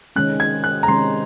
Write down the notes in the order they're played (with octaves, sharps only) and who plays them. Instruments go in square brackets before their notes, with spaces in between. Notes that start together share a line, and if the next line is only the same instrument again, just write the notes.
[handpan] C3 D#3 G#3 C#4 [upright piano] F#6
[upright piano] G#6
F#6
A#5
[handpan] C3 D#3 G#3 C#4 [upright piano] C6